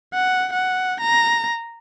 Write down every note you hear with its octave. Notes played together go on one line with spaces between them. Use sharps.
F#5
F#5
A#5